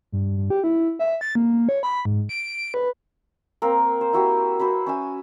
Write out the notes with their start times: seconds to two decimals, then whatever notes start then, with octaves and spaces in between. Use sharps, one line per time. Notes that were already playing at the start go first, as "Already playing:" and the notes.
0.13 G2
0.37 G2
0.50 G4
0.64 E4
0.99 E5
1.21 A6
1.35 A#3
1.69 C#5
1.83 B5
2.05 G#2
2.29 D7
2.74 B4
3.62 A#3 C4 A#4
4.01 C5
4.13 E4 F#4 G4
4.59 F#4 B4 C5 B5
4.86 C#4 E5 G#5